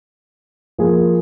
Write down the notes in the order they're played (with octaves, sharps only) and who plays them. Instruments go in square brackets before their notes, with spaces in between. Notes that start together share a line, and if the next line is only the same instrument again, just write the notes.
[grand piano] F3 A#3 G#4